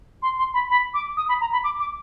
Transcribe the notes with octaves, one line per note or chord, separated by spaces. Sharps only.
C6
C6
B5
B5
D6
D#6
B5
A#5
B5
D6
D6